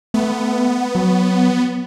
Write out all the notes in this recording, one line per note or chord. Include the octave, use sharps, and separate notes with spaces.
A3 B3
F#3